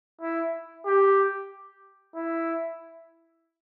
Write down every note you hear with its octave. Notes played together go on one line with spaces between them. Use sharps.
E4
G4
E4